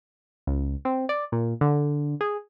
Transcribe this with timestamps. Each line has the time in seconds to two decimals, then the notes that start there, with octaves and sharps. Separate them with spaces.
0.47 C#2
0.85 C4
1.09 D5
1.32 A#2
1.61 D3
2.21 G#4